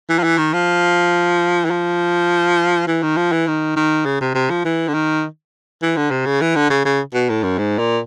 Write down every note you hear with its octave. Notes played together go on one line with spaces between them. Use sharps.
E3
F3
E3
D#3
F3
E3
F3
E3
D#3
F3
E3
D#3
D#3
C#3
C3
C3
F3
E3
D3
D#3
E3
D3
C3
C#3
E3
D3
C#3
C#3
B2
A2
F#2
G#2
A#2